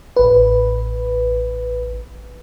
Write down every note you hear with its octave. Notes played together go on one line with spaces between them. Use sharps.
A1 B4